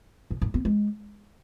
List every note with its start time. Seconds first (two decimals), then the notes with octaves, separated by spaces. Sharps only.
0.31 G#2
0.42 G#2
0.54 B3
0.65 G#3